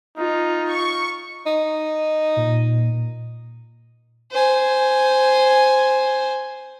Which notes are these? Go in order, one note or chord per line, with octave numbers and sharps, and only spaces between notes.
D#4 F4
C#6
D#4
A#2
C5 G#5